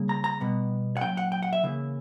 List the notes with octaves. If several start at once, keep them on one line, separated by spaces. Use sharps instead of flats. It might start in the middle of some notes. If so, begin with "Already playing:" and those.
Already playing: C#3 G3 A#3
A#5
A#5
B2 G3 B3
F#5
A#2 F#3 C#4 G5
F#5
G5
F#5
E5
C#3 E3 A#3